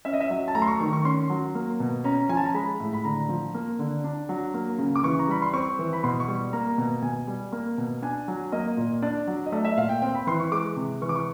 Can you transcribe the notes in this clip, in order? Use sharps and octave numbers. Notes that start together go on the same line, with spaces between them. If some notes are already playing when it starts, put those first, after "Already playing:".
C#4 E5
D#5
E5
F#3
A5
A3 A#5
C6
C#6
D#3 C#6
C#6
C#4 C6
F#3
A#3
B2
C#4 A#5
F3 G#5
A5
A#5
G#3 B5
A2
B5
D3 A#5
F3
A#3
D3
D4
F#3
A#3
C#3
D6
E3 C#6
A#5
G3 B5
C6
C4 C#6
E3
B5
B2 C6
C#6
G3
A#3 A#5
B2
B2 G#5
G3
A#3
B2
D4 G#5
F#3
A#3 D#5
A#2
D4 D5
F#3
D#5
A3 D5
E5
A#2 F5
G5
C4 G5
B5
E3 C6
C#6
G#3 D6
C3
E3 C#6
D6
C#6